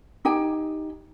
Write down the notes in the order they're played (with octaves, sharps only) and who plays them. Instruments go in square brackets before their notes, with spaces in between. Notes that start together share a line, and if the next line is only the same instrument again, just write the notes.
[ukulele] D#4 G4 G5 G#5